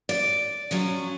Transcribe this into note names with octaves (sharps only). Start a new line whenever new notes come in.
D5
F3 F#3 C#4